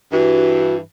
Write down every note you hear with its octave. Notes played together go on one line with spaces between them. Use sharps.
G2 E3 F#4